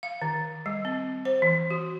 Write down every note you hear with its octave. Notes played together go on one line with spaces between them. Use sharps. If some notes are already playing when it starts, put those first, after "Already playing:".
F5
D#3
G3
C4
C5
E3
F#4